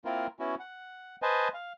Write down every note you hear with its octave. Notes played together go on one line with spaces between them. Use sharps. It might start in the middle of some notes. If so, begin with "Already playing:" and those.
A#3 C4 E4 F4 A#4
B3 C#4 E4 F#4
F#5
B4 C5 D#5 G#5 A5
F5